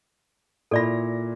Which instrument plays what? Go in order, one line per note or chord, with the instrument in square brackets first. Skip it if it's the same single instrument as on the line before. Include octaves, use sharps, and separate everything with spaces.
[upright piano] A#2 E4 A#6 [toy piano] A4 D5 B5